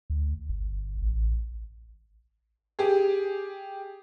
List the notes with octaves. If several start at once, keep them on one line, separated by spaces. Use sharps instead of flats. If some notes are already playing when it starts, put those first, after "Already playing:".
D2
G1
A1
G4 G#4